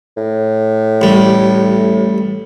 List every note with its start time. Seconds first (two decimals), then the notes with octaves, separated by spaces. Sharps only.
0.17 A2
1.01 A1 G3